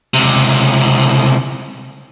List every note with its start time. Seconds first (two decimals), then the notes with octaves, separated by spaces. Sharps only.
0.14 C#2 C3